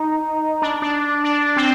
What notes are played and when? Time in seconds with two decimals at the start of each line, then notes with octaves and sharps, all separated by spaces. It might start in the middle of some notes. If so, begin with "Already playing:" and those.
Already playing: D#4
0.62 D4
0.82 D4
1.24 D4
1.56 C4